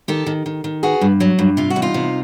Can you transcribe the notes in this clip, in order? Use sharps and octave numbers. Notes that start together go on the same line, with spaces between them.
D#3 G4 A4
D#3
D#3
D#3
B3 F#4 G#4
G2
F#3
G2
C3 F4
F#4
E2
D#4 F4
C3